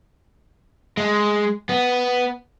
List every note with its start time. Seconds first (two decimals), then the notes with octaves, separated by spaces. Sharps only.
0.97 G#3
1.69 B3